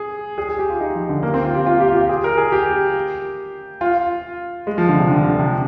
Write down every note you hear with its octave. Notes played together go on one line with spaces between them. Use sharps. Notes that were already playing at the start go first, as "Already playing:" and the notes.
Already playing: G#4
G#4
G#4
G4
F4
D#4
F3
D3
A#3
C4
F4
G4
F4
G4
F4
G4
G#4
A#4
G#4
G4
F4
G#3
F3
D3
C3
D3
D3
C3